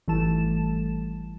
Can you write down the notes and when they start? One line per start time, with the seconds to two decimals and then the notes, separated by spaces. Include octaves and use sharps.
0.08 G#1 E3 G3 A3 A5 E7